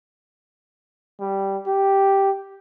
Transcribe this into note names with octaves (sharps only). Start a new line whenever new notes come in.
G3
G4